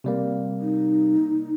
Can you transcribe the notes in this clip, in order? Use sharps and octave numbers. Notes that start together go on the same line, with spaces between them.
C3 G3 A#3
D#4